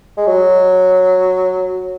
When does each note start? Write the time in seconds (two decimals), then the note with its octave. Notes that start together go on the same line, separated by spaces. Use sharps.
0.17 G#3
0.27 F#3